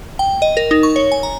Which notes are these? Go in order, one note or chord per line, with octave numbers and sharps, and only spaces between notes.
G5
D#5
A#4
D#4
C#6
C#5
G#5
A#5